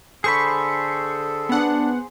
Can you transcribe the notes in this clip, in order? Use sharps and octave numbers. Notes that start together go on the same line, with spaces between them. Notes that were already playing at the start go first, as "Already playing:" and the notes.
D3 G#4 A4 C5 B5 C#6
B3 D4 F#5